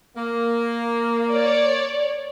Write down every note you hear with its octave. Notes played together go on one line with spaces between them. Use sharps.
A#3
C#5 D5